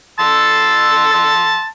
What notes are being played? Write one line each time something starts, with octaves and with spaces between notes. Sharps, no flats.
A5 C6 E6